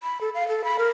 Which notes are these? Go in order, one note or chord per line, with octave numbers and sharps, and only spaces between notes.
B5
A4
F5
A4
B5
A#4